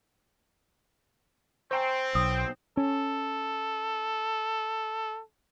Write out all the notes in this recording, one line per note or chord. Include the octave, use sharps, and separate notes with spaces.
C4 C5 G5 G#5 A#5 C#6
B1 D#6
C#4 A4